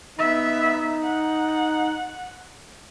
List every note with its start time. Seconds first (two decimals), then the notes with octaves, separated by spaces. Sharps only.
0.18 B3 D#4 E5
1.04 F#5